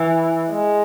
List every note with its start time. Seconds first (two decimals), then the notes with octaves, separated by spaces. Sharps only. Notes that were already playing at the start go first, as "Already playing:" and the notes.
Already playing: E3
0.51 G#3